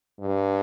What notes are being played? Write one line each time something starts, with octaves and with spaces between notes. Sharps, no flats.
G2